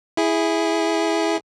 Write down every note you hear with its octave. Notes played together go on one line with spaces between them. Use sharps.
E4 G#4